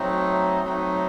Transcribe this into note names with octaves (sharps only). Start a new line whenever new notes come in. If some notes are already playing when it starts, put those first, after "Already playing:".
Already playing: F#3 A3 C4 D#4
F#3 A3 C4 D#4